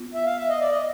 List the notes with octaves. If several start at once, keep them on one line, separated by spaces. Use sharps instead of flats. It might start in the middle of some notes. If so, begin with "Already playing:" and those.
Already playing: B3 F4
E5
F5
E5
D#5
D5
D#5